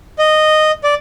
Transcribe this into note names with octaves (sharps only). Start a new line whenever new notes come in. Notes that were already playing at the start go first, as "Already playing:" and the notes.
D#5
D5